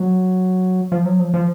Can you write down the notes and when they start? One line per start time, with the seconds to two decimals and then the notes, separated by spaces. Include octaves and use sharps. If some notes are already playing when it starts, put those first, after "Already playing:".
Already playing: F#3
0.92 F3
1.05 F#3
1.20 F3
1.34 F3